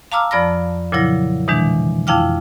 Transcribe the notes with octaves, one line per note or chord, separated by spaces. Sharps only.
F5 A5 A#5 D6 E6 F6
F2 F3 D5 B5 F6 A#6
A#2 C#3 F3 F#3 E4 A#6
B2 D#3 E3 G#3 D4
F2 E4 F5 G5 D6 F6